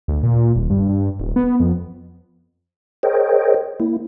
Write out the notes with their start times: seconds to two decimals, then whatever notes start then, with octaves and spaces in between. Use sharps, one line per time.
0.08 D2
0.23 A#2
0.56 D#1
0.70 G2
0.89 G2
1.20 D#1
1.36 B3
1.60 F2
3.03 G#4 A#4 C5 C#5 D#5 G5
3.80 A#3 E4